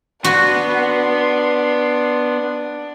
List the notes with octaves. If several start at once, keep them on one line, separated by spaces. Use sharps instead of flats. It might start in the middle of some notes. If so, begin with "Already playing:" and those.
B3 D4 F#4 F#5 C6